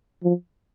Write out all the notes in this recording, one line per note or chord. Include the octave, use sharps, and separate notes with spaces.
F3